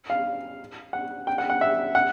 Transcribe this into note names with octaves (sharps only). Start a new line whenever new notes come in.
F5
F#5
G5
F#5
F#5
E5
F#5